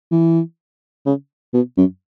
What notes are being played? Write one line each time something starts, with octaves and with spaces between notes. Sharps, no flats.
E3
C#3
B2
F#2